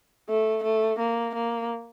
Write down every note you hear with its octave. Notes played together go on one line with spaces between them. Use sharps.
A3
A3
A#3
A#3